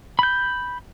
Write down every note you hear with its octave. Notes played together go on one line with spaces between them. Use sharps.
B5 G6